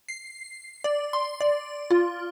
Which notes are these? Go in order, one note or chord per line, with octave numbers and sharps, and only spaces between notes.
C7
D5
C6
D5
F4